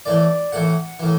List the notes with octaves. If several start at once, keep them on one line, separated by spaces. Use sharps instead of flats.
A2 E3 D5
A2 E3 F#5
A2 E3